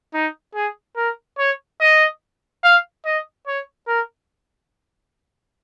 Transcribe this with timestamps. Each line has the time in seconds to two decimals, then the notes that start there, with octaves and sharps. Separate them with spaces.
0.14 D#4
0.55 G#4
0.96 A#4
1.38 C#5
1.81 D#5
2.64 F5
3.05 D#5
3.47 C#5
3.88 A#4